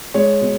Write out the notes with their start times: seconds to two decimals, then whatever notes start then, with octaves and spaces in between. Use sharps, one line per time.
0.14 G#3 C#5
0.41 B2